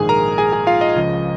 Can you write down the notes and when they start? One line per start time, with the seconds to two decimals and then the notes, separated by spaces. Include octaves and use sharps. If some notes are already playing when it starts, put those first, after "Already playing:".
Already playing: A#1 G#2 D#3 G#4 G#5
0.09 A#4 A#5
0.38 G#4 G#5
0.52 G#4 G#5
0.67 F4 F5
0.81 D#5
0.96 C#2 C#3 F3